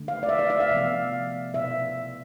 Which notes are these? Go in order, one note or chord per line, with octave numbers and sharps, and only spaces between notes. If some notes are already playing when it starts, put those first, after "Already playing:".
Already playing: D3 A3
F5
D5
E5
D5
E5
F5
C3 F3 B3
B2 E5